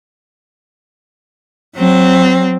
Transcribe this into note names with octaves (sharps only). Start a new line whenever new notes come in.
F#3 C4